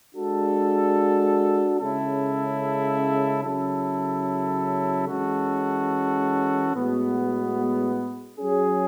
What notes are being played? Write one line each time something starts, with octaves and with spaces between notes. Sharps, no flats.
G#3 D4 F#4 A4
C#3 G#3 C#4 E4 A4
C#3 F#3 C#4 E4 A4
E3 G#3 C#4 F#4 A4
A2 G#3 B3 F#4
F#3 C#4 G#4